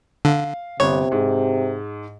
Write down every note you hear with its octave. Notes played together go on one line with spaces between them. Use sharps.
D3 F5
G1 C3 C#5
G#2